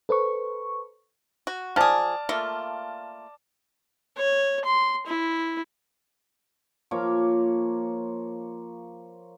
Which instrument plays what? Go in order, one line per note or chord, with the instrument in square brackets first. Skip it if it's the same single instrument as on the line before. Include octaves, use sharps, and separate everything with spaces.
[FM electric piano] A4 B4 C5 C#6
[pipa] F#4
[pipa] F3 G#4 [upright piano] D5 A5 F6
[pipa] A3 A#3 F4
[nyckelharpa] C#5
C6
E4
[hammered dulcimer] F3 A#3 C#5 D6